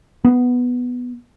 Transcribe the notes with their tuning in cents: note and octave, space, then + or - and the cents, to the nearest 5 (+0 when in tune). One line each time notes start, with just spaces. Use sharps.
B3 +0